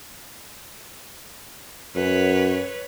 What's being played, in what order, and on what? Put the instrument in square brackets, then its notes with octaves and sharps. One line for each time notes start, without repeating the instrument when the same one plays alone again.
[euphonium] F#2 [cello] B4 C#5